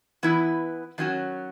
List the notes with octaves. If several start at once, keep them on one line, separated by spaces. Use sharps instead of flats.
E3 B3 E4 B4
D#3 F#3 C#4 F#4